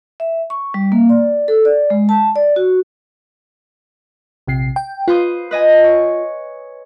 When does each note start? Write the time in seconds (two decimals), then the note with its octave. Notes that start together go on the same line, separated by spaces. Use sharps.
0.20 E5
0.50 C#6
0.74 G3
0.92 A#3
1.09 D5
1.48 A4
1.65 D5
1.90 G#3
2.09 A5
2.36 D5
2.56 F#4
4.47 A#1 C3 C7
4.76 G5
5.08 F4 B4 C5 D#6
5.51 B4 D#5 G#5
5.84 C#5